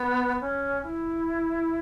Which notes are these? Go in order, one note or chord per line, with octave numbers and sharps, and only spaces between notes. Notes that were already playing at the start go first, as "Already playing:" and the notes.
Already playing: B3
C#4
E4